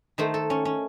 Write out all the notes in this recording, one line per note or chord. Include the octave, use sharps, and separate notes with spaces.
D#3 A3 C5
A4
C#4
C#4